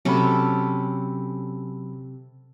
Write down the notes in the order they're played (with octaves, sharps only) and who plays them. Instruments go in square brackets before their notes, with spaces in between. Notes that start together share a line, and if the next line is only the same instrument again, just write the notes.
[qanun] C3 C#4 A4 [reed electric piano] F#3 B5